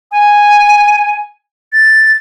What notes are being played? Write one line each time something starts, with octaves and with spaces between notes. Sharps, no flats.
G#5
A6